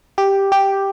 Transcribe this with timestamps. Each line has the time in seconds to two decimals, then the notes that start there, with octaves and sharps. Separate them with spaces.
0.18 G4
0.52 G4